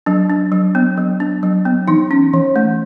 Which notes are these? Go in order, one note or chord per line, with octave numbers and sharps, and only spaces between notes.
F#3 D4
D4
F#3
B3
F#3
D4
F#3
B3
E3 D#4
C#4
E3
A3